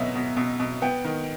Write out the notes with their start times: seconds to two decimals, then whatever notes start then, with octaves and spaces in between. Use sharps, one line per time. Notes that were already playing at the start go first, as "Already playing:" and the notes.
Already playing: B2 F#3 B3 D#5 E5
0.15 B2
0.37 B2
0.60 B2
0.82 B3 G5
1.04 D#3